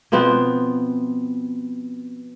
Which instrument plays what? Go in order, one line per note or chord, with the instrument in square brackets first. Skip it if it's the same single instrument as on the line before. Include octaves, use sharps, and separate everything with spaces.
[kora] B2 F3 B3 C4